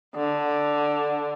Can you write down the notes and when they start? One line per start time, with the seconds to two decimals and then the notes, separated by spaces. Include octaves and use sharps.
0.15 D3